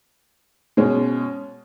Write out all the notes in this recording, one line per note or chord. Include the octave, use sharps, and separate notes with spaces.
B2 G#3 C#4